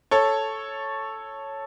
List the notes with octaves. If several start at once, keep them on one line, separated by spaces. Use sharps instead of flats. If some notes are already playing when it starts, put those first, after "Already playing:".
A4 C#5